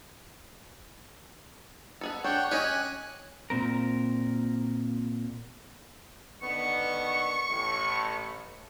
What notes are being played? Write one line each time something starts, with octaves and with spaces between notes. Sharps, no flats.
B3 G#4 A4
D4 C#5 F#5 G5
C#4 G4 C#5 D#5 G#5 F#6
A#2 C4 A#4
D3 D#3 B3 C#6
A1 A2